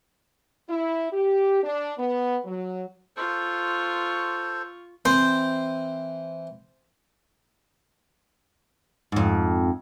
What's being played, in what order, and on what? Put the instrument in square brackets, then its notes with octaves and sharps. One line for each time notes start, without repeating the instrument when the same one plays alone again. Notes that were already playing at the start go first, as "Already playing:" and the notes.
[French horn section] E4
G4
D4
B3
F#3
[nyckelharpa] F4 C#6 [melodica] A4 C5
[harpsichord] E3 C4 [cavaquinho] C5
[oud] F2 G#2